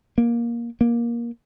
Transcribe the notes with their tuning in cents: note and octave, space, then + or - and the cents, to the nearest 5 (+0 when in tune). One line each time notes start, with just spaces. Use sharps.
A#3 +15
A#3 +15